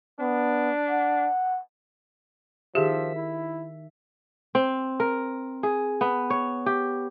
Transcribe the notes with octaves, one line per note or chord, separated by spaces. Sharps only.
B3 D4
F#5
D#3 F3 G4 G#4 E5
E4
C4
A#4
G#4
B3
C#5
G4